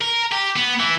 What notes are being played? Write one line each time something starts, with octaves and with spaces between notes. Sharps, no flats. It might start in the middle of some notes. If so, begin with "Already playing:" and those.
A#4
G4
B3
E3